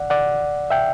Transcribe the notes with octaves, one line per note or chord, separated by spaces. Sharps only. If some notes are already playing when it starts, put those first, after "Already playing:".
Already playing: D5 F#5
D5 F#5
E5 G5